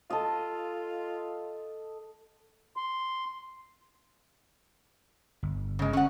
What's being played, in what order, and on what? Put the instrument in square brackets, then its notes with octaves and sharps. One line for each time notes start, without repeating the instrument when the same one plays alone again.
[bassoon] F4 [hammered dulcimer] A4 D#5
[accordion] C6
[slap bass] G1
[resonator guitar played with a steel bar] C#3 G#3
C#4 F#5